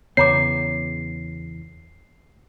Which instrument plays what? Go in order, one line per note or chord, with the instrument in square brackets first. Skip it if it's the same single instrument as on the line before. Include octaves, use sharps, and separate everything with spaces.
[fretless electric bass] E2 C#3 B3 [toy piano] C#5 A#5 D6 [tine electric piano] C7